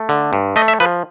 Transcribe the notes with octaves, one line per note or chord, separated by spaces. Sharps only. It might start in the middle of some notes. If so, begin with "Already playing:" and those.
Already playing: A3
D3
G2
A3 D#5
E5
F3 B4